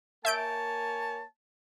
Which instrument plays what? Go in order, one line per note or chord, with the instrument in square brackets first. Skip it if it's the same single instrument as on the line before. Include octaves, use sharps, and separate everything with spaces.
[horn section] A#3 C#5 G#5 [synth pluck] E5 G6 D7 [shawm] A5